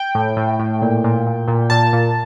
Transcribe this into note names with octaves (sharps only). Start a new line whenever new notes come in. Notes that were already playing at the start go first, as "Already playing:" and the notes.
Already playing: G5
A2
A2
A2
A#2
A#2
A#2
A#2
A#2 A5
A#2